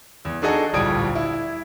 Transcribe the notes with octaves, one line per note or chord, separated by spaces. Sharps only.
E2
D4 D#4 F#4 G#4 A4 D#5
D1 A#1 G3 D#6 G#6 D7
E4